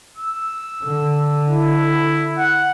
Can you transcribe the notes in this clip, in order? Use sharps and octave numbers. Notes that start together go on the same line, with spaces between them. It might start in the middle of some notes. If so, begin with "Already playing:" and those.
E6
D3
E4
F#5